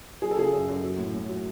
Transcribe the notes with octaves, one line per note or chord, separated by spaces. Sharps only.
F#3 G#4
A4
C#3 G#4
F#2
F#2
F#3
A2
A2
F#3